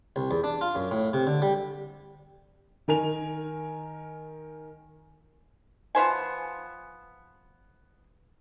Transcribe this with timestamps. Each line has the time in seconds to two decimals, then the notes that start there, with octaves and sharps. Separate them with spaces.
0.16 C2
0.31 E2
0.44 D4
0.61 F4
0.75 F#2
0.91 A2
1.13 C3
1.27 D3
1.42 G3
2.88 D#3 A#4 G#5 F7
5.95 F3 B3 C5 G#5